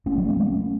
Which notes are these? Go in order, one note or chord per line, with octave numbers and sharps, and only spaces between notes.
A3 C#4
F#3 A3
G#3 B3
A3 C#4